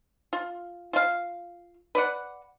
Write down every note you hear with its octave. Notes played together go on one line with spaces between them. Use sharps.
F4
F4 F5
B4 D5 F#5